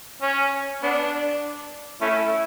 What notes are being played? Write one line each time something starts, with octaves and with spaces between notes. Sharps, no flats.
C#4
B3 D4
A3 C#4 E4